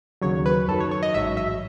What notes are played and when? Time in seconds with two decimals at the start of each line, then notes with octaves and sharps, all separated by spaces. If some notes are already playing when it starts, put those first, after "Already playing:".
0.22 D#2 C#3 F#3 C#5
0.46 B4
0.68 F#2 D#3 F#3 A4
0.80 C#5
0.91 C#5
1.03 D#5
1.14 A1 G#2 F#3 E5
1.37 E5